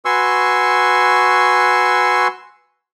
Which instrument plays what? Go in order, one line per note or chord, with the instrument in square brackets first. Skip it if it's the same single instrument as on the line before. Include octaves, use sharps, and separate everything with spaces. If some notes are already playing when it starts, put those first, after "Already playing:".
[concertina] F#4 B4 G#5 C6 C#6 E6